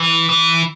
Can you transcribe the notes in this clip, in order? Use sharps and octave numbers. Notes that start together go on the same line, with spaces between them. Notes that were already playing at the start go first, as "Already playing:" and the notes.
Already playing: E3
E3